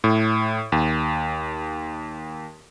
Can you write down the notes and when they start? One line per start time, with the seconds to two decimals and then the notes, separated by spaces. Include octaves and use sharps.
0.04 A2
0.72 D#2